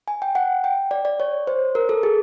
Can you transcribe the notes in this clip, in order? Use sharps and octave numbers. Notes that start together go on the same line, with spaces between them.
G#5
G5
F#5
G5
D5
D5
C#5
C5
A#4
A4
G#4